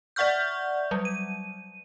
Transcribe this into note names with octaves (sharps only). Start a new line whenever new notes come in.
D5 E5 F#5 C#6 F6 G6
F#3 G3
D#7